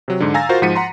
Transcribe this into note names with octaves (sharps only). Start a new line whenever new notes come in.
C3 F#3
G#2 D3
F5 G#5 A#5 E6 A6 A#6
F4 F#4 A#4 C5 F5
G#2 F3 F#5 B6 C#7 D#7
F#5 A#5 C6